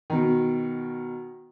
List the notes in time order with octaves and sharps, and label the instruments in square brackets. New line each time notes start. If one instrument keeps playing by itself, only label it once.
[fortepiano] B2 D#3